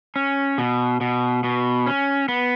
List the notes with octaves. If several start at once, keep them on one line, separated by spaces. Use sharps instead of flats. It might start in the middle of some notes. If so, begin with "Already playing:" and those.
C#4
B2
B2
B2
C#4
B3